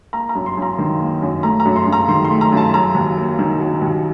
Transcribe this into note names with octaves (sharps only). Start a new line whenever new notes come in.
A#3 A#5
A#5
F#2
C6
F#2 A#5
D#3
A#3
F#2
A3 A#5
A#5
F#2
C6
F#2
A#5
D#3 C6
C6
A3
A#5
F#2 A5
F#3 A#5
D#2
A#3
D#3
F#3
D#2